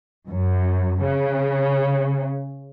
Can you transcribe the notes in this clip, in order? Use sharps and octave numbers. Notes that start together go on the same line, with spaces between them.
F#2
C#3